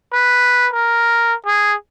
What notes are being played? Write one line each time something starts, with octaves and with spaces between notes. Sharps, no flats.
B4
A#4
G#4